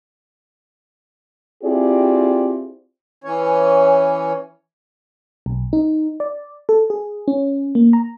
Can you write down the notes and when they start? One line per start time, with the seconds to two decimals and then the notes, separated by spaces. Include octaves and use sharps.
1.64 C4 E4 F4 G4 G#4 D5
3.24 E3 C#4 C#5
5.46 B1
5.73 D#4
6.20 D5
6.69 A4
6.90 G#4
7.28 C#4
7.75 A#3
7.93 A#5